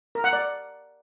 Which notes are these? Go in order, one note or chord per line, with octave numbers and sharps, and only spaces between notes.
A#4
F#5
D5